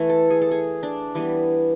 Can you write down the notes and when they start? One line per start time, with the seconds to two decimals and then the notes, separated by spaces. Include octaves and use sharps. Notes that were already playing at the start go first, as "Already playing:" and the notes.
Already playing: E3 A3
0.09 A4
0.30 G#4
0.42 A4
0.51 G#4
0.83 D4
1.15 E3 G3 B3